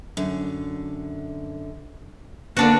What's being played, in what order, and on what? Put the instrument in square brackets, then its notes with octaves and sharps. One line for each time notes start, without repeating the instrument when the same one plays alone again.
[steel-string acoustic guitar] F#2 D3
[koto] D3 D4 F#4 [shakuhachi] A#3 [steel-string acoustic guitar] B3